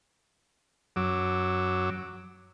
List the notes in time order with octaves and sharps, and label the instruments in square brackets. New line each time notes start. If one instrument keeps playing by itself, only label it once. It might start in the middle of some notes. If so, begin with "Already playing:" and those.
[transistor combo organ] F#2 F#3 D6 E6